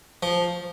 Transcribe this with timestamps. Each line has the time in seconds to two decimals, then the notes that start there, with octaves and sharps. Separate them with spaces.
0.23 F3